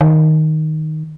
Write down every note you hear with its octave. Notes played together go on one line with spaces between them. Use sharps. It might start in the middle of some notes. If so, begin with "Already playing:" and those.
D#3